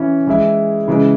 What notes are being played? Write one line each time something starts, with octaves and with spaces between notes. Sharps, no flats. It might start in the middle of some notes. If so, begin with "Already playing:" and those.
Already playing: E3 C#4 E4
E3 G#3 E4
C#3 E3 G#3